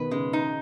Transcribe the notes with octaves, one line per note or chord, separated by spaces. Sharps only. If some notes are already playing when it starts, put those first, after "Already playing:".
Already playing: B2 D#3 B4
C#3 G#3
D#4